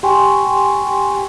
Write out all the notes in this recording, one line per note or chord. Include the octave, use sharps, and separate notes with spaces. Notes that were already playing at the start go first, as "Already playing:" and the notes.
G4 G5 G#5 C6 C#6